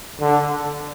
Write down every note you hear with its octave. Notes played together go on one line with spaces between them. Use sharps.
D3